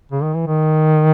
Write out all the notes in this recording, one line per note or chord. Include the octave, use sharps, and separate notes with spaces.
C#3
D#3
E3
D#3